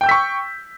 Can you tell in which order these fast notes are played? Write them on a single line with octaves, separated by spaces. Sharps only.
G5 G6 E6 B6 C#6